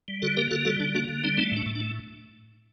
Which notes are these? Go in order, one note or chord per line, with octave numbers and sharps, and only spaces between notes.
G3
D3 F#4 A4
A#3 G4 A#4
D3 F#4 A4
G3 F#4 A4
D3 D4
A#3 D4 F#4
D3
G3 C4 D#4
A3 C4 D#4
A2
D4
A2
D4
A3